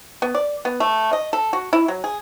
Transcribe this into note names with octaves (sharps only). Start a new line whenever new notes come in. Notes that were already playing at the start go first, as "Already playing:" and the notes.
B3
D5
B3
A3
D#5
A4
F#4
E4
F#3
G#4